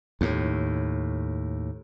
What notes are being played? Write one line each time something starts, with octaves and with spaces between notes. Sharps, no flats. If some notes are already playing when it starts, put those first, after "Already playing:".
D#2 A2